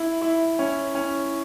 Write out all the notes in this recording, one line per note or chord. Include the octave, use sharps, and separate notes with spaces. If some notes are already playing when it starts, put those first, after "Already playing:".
Already playing: E4
E4
C#4
C#4